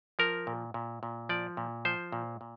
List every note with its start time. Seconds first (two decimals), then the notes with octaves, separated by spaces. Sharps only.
0.19 F3 A#4
0.47 A#2
0.74 A#2
1.03 A#2
1.29 F3 D5
1.57 A#2
1.85 F3 C5
2.12 A#2
2.41 A#2